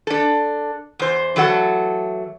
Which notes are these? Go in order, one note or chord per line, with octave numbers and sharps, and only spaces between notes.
D4 A4
E2 C5
E3 F#3 A3 A4 F#5